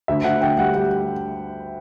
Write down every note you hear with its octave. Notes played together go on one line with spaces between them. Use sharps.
D2 E5
D2 F#5
D2 G5
G3 F#5
G3 F#5